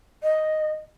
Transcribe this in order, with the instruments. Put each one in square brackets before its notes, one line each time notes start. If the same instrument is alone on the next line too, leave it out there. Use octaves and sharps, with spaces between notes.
[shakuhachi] D#5